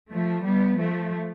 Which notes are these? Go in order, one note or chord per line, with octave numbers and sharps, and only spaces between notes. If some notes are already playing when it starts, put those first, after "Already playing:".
F3 A3
G3 B3
F3 A3